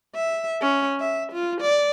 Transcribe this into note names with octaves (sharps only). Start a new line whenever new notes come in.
E5
C#4
E5
F4
D5